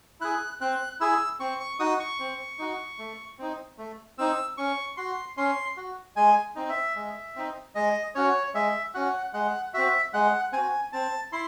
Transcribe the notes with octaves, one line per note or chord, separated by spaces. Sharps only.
E4 G#4 F#6
C4 F#6
E4 G#4 E6
C4 C#6
C#6
D#4 F#4 D#6
C#6
C4
D#4 F#4
A3
C4 D#4
A3
C4 D#4 E6
C#4 C#6
F#4 C6
C#4 C6
F#4
G#3 G#5
C4 D#4
E5
G#3
C4 D#4
G#3 D#5
C#4 F#4 C#5
G#3 E5
C#4 F#4 F#5
G#3 F#5
C4 F#4 E5
G#3 F#5
C4 F#4 G#5
C4 A5
E4 C6